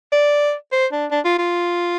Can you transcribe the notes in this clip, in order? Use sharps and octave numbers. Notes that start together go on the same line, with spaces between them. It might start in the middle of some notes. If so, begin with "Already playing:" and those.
D5
C5
D4
D4
F4
F4